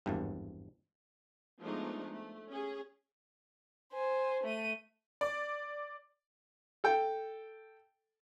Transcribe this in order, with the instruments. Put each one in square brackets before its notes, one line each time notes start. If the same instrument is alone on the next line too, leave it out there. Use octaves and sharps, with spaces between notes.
[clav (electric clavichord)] G#1 E2 G2
[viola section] F3 G#3 A3 B3 D4 D#4
A3
C#4 G#4
[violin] C5 G#5
A3 D#7
[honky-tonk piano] D5
[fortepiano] A4 G5